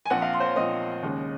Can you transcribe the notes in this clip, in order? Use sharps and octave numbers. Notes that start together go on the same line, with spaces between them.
G#5
A#1 A#2 F3 C4 F#5
F5
C6
C5
C#5
A#1 A#2 F3 C4 D#5
D#2 C#3 G#3